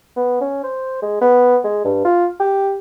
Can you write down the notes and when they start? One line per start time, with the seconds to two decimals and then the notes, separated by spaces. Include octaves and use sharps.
0.17 B3
0.41 C#4
0.64 C5
1.02 G#3
1.21 B3
1.64 G#3
1.85 G2
2.05 F4
2.40 G4